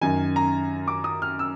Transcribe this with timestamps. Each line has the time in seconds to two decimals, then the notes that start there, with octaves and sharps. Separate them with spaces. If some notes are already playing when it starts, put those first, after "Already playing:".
0.01 F#2 D#3 G#5
0.36 A#5
0.88 D6
1.04 D#6
1.22 F6
1.39 E6